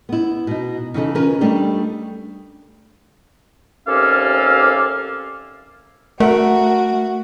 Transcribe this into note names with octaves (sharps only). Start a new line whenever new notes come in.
B3 E4
B2 D#4
C#3 E3 D#4 A4
C#4 F4 A#4 B4
G3 A3 D4 D#4 G4
D#2 C3 C#4 A4 D5 F5
A3 F#4 A#4 E5 F#5